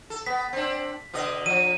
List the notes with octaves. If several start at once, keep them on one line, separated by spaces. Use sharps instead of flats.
A4
B3 B6
C4 D4
B2 D3 D#5
F3 D#7